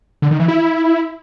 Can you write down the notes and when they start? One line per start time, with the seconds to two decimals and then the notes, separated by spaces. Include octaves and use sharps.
0.22 D3
0.31 D#3
0.40 E3
0.48 E4